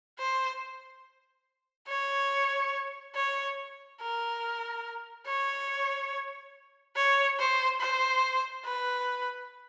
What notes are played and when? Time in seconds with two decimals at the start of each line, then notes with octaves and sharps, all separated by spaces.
0.19 C5
1.88 C#5
3.15 C#5
4.01 A#4
5.27 C#5
6.96 C#5
7.39 C5
7.81 C5
8.65 B4